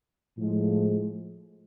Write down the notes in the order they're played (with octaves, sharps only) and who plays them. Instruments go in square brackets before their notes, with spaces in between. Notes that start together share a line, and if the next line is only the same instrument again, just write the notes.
[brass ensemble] A2 F3 G#3